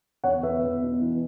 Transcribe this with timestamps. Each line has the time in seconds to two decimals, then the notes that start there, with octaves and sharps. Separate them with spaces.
0.24 E2 C#5 F#5
0.43 E2 B4 E5
0.63 E2
0.82 B2
1.02 E3